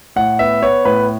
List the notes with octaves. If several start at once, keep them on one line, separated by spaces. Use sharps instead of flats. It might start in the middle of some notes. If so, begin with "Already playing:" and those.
A2 F#5
B3 E5
B3 C#5
A2 B4